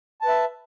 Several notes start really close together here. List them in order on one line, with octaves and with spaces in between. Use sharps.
A5 B4 E5